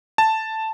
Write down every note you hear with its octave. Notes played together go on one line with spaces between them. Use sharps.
A5